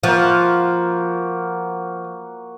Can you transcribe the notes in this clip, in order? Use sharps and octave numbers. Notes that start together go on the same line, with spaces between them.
F3 A#3 F#4